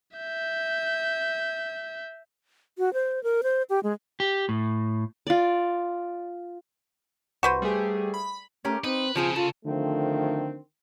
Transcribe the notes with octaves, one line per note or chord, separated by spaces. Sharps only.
E5 G6
F#4
C5
A#4
C5
G4
G#3
G4
A2
F4 D5
C2 F#4 B4 C5
G3 A3 G#4
B5
A3 C#4 G4 A#4
C4 D#4 B4
C#3 F3 C4 F4 G#4
F4 A4
D3 D#3 F3 A3 C4